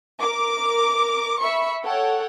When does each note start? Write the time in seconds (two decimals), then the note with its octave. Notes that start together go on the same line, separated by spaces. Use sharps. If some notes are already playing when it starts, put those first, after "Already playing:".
0.19 A#4 D6
1.40 E5 B5 C#6 C#7
1.84 A4 C#5 F#5 G5